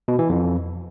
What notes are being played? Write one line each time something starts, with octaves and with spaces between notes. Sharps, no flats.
B2
E3
F2